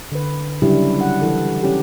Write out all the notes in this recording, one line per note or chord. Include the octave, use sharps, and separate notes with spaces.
D3 B4
C#3 F#3 G3 D4 E4 G4
F#5
E3 A4
C#4 G4